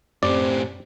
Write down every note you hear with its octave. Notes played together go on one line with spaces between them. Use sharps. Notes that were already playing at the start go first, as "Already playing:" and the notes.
F#2 A2 C4 G4 D5